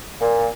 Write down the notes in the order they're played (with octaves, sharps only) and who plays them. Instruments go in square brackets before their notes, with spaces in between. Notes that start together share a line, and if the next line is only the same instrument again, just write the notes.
[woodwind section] A#2